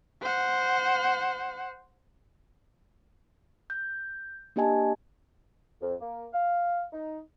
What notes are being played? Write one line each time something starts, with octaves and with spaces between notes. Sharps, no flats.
C5 F#5
G6
A#3 D4 G4 D#5 G#5 A5
F2
A#3
F5
D#4